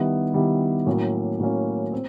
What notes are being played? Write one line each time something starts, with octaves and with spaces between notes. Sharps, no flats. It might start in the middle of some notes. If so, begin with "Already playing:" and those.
Already playing: D#3 G3 B3 E4
D#3 G3 B3 E4
A2 F#3 A#3 C#4
A2 F#3 A#3 C#4
C4